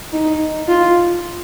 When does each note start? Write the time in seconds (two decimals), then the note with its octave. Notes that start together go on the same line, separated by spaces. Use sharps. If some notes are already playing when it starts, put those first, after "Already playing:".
0.13 D#4
0.68 F4